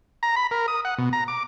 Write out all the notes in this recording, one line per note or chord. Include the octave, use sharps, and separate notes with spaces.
A#5
B5
A#4
D#6
F#5
B2
A#5
D6